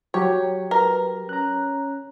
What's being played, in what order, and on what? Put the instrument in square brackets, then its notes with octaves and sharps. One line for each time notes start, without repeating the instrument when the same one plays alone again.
[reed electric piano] F#3 G4 [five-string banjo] C#5
[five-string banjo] A#4 [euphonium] B4
[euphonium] C#4 [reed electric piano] A#5 F#6